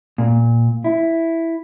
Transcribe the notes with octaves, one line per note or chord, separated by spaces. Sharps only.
A#2
E4